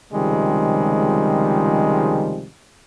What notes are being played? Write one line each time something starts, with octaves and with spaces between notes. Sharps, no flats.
C#2 C3 D#3 F3 G3 G#3